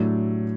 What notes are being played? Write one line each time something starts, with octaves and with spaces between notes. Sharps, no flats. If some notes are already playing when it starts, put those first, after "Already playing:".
Already playing: A2 F#3 A3 D4 A4